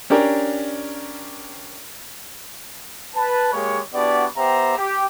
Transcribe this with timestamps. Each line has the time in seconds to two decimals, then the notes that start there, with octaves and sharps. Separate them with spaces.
0.10 C#4 D4 G4 A#4
3.15 B4 A5
3.52 G#3 A#3 G4 C#5
3.94 B3 D4 E4 F#4 G4 D5
4.36 B3 G4 C5 E5 G5 A#5
4.77 G4